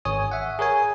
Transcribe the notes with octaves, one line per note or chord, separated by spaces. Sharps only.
G#1 C#5 G#5 D#6
E5 F#5
G#4 A#4 C#5 G#5